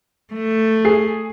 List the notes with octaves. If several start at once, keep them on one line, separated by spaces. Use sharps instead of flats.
A3
G#4 C7